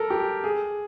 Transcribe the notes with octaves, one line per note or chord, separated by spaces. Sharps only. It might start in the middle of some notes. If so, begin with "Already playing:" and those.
Already playing: A4 A#4
G4
G#4